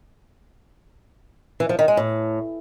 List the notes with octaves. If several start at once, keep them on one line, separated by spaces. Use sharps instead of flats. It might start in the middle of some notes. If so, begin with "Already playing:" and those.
E3
F3
D#3
G#3
A2